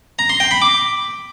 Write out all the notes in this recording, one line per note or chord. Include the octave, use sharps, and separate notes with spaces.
A#5
C6
G5
B5
D6